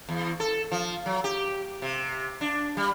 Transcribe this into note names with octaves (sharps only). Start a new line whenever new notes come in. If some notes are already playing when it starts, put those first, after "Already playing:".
E2
A4
F3
F#3
G4
C3
D4
G3